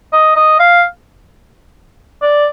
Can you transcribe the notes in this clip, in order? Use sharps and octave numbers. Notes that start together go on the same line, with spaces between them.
D#5
D#5
F5
D5